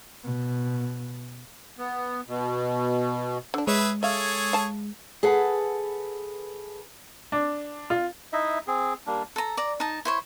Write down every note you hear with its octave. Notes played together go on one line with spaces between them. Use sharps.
B2
B3
B2
D3 D4
G#3 G#4 B4 C#5 E5
G#4 A4 C#5 E5 F5
F5 A5
G#4 A4 B4 F#5
D4
F4
D#4 E4 D#5 E5
C4 G#4
G3 A#3 D4
A4 A#5
D5 A#5
D#4 A5
E4 C5 C#5